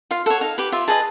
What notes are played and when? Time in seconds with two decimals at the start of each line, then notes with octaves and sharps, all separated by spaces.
0.11 F4 F5
0.26 A4 C#5 F#5
0.41 D#4 F5
0.58 G4 B4
0.72 F4 E5
0.88 G#4 B4 D#5 A5